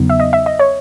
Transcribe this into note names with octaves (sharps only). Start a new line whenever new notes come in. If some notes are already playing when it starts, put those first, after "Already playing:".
Already playing: E2 C#3 F#3 B3 D#4
E5
D#5
E5
D#5
C#5